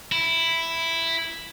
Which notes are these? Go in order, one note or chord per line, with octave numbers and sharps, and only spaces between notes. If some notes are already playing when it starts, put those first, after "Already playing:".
E4